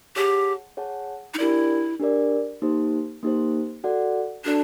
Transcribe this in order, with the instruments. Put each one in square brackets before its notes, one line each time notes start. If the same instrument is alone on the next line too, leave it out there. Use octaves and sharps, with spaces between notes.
[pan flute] G4 [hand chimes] G#4 C#5 F#5 A5
[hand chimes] G#4 C#5 F#5 A5
[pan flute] D#4
[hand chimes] D4 G4 A#4 D5 [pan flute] E4
[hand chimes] D4 G4 A#4 D5
A#3 D#4 G4 C5
A#3 D#4 G4 C5
F#4 A4 D5 F#5
[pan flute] D4 [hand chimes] F#4 A4 D5